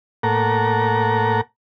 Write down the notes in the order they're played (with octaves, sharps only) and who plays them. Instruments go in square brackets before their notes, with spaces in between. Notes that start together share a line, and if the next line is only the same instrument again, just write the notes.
[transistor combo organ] A2 A#3 A4 A#4 F#5 A#5